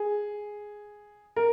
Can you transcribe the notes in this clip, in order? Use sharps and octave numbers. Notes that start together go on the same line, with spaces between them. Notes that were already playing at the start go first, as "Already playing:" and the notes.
Already playing: G#4
A#4